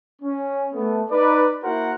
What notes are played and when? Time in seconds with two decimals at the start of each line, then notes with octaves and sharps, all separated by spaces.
0.22 C#4
0.73 A3 B3
1.11 D#4 B4 D5
1.63 A#3 E4 F#4 A#4 C5 F#5